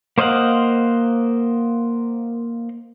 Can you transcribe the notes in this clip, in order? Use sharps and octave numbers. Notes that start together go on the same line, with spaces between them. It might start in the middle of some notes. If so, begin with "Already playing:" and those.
A#3 C5 D#5 F5 F#5